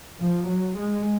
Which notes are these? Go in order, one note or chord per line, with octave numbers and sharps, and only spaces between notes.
F3
F#3
G#3